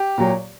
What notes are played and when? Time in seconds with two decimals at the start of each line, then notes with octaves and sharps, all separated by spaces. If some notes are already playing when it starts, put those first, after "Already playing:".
Already playing: G4
0.18 A#2 F#3